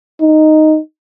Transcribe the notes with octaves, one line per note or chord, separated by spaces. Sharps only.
D#4